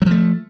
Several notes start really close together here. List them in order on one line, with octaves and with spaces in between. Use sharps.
F#3 F3 A3